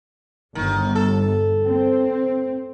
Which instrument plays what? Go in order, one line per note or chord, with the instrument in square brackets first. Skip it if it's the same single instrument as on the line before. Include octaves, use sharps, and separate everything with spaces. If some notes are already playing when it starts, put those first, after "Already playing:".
[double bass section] G1 [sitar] D#3
[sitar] A4
[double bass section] C4